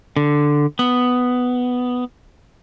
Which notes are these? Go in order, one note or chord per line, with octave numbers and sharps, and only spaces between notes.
D3
B3